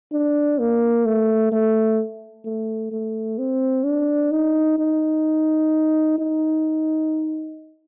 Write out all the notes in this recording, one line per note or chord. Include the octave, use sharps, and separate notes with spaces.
D4
A#3
A3
A3
A3
A3
C4
D4
D#4
D#4
D#4